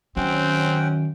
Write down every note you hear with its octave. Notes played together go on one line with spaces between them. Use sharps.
F#2 D#3 C4 C#4 F#5 G5